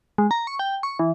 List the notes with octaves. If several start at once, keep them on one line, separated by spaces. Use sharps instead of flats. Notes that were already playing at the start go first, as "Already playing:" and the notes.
G#3
A#5
C#6
G5
C#6
E3